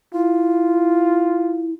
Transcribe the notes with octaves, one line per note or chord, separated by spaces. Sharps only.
E4 F4